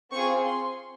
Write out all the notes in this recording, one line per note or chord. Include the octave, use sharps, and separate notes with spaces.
C4 F4 G#4 C#6
C6